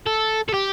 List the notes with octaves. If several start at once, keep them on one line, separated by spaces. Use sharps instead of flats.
A4
A4
G4